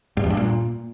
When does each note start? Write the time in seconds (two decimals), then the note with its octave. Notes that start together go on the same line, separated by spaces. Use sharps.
0.17 G2
0.24 E2
0.30 G2
0.37 A#2